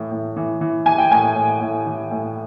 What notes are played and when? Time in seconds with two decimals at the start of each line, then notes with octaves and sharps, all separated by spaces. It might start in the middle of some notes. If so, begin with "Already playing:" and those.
Already playing: A2 E3
0.11 A2
0.37 E3
0.61 E3
0.86 E3 G#5
0.98 G5
1.11 A2 G#5
1.35 A2
1.61 A2
1.86 E3
2.11 A2